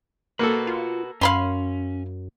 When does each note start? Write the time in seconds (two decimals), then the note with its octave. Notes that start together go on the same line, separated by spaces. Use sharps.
0.39 A#3 F#4 A4 B4
0.67 F4
1.21 F#2 C#4 F5 B5 C6